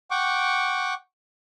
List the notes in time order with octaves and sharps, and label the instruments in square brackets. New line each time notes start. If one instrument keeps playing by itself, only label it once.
[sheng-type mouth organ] F#5 G5 C#6 D6